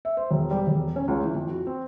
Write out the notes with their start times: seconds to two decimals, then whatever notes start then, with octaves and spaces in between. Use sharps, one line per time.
0.05 E5
0.17 C5
0.31 E1
0.51 G3
0.67 E1
0.96 C#4
1.08 C#2
1.23 E3
1.35 F2
1.49 F#4
1.67 C4